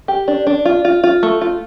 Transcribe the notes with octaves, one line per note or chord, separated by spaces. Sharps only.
G4
D4
D4
F4
F4
F4
A3
F4